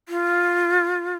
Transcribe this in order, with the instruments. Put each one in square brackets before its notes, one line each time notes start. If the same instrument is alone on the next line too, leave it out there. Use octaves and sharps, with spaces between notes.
[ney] F4